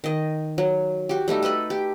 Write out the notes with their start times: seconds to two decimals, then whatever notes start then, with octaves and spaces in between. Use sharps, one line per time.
0.04 D#3 D#5
0.58 F#3
1.09 F#4 G4
1.28 G3 A3 D#4 F#4
1.43 A4 B4 D#5 B5
1.70 G4